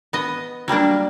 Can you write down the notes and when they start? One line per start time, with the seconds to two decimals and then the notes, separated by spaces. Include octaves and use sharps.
0.13 B3 D#5
0.68 F#3 G3 A#3 D4